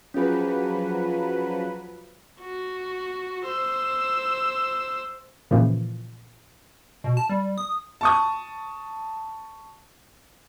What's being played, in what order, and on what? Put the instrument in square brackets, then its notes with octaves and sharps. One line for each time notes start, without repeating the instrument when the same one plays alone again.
[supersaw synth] F3 F#3 B4 [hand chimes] C#4 G#4
[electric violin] F#4
C5 E6
[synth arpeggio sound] A#2 C#3 E3 F3
[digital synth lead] B2
A5
G3
D#6
[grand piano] A5 C#6 D#6